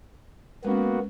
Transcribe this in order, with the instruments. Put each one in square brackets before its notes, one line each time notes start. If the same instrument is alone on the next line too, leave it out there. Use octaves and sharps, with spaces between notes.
[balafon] G#3 C#4 [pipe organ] A#3 B3 F#4